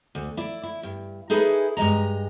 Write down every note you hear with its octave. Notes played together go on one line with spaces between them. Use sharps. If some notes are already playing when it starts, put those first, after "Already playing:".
D2
E4 D5
E4
G2
D#4 E4 G#4 A4 B4
G2 G#3 D#5 A#5